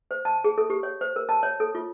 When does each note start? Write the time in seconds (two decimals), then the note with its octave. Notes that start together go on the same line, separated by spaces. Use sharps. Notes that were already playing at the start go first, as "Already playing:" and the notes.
0.11 C5
0.25 A5
0.44 G#4
0.58 A4
0.70 G4
0.83 C#5
1.01 C5
1.16 A#4
1.29 A5
1.43 C#5
1.60 A4
1.75 F4